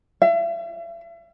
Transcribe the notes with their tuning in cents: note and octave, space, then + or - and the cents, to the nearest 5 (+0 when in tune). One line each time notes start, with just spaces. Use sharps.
E5 +40